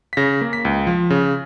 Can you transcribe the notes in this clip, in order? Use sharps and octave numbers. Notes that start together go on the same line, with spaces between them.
B6
C#3 A#6
A#3
B6
C#2
F3
C#3